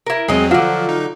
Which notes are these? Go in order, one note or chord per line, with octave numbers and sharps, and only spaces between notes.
E4 A#4
E2 F#3 G#3 C4 D#5
D3 F3 F#3 F4
D#4